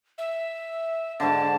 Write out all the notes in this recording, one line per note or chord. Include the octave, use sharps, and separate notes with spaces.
E5
G#2 D3 A5